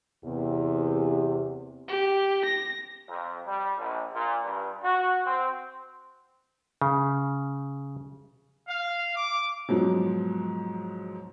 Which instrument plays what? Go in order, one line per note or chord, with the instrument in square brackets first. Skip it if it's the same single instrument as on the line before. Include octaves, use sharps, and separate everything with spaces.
[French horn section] E2 C3
[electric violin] G4
A#6
[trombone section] F2
G3
A#1
A#2
G2
F#4
C4
[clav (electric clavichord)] C#3
[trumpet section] F5
D6
[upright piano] G#2 B2 F3 F#3